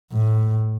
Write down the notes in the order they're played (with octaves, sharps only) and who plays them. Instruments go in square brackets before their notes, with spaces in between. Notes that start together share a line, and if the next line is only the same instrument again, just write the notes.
[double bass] A2